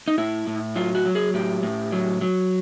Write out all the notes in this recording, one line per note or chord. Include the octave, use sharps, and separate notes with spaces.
D#4
A2 E4
A2
F#3 F4
F#4
F#3
G#4
A2 G4
A2
F#3
F#3